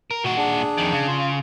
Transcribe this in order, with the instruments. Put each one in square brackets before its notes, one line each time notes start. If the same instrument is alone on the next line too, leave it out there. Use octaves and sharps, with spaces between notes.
[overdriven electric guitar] A#4
[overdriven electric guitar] A#2 F#5 [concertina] F#4
[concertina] D4 G#4
[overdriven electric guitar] F2 D#3
C#3
[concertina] F4